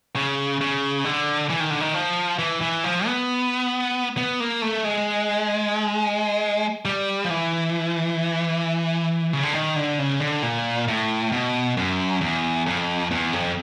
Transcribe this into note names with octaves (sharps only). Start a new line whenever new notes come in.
C#3
C#3
D3
E3
D#3
D3
D#3
F3
E3
E3
F3
B3
B3
A#3
A3
G#3
G3
F3
E3
C#3
D3
D#3
D3
C#3
D3
A#2
A2
B2
F#2
E2
F2
E2
F2